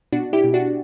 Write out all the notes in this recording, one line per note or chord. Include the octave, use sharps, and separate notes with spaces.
B2 D4 F#4
E4 G4
B2
D4 F#4